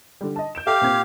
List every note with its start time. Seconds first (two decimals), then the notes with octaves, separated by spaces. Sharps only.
0.21 D3 G3
0.36 D#5 A5
0.55 G6 D7 E7
0.67 G4 A4 E5 F5
0.81 A#2 C4 G#6